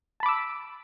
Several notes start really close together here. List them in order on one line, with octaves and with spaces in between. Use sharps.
A5 B5 D6 E6